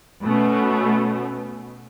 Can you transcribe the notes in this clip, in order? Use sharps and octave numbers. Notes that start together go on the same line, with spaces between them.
B2 A3 B3 C#4